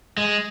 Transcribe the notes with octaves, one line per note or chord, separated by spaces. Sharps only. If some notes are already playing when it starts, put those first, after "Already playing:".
G#3